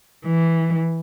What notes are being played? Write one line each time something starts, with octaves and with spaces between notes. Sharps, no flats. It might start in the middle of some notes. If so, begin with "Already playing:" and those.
E3